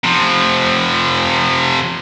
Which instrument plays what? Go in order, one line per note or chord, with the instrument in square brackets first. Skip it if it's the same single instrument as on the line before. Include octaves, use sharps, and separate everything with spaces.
[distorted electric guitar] C3 F3